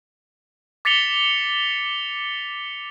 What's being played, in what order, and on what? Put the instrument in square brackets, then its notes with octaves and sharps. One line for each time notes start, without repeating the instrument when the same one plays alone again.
[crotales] D6 A6 B6 C#7 F7 G7